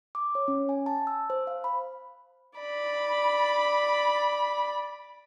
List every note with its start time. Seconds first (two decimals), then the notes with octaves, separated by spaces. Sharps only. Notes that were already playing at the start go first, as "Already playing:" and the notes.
0.15 D6
0.35 C#5
0.48 C#4
0.69 G#5
0.86 A5
1.07 E6
1.30 C5
1.47 F5
1.64 B5
2.59 D5 B5